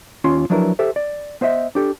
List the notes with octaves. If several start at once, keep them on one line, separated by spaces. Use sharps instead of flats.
D#2 C#4 F4 C6
F3 F#3 D4 E4 A#4 B4
G4 A4 C5 E5
D5
B3 C5 D#5 E5
D4 G4 A4